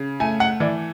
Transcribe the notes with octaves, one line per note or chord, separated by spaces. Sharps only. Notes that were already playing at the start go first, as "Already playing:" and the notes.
Already playing: C#3
A3 G#5
F#5
E3 D5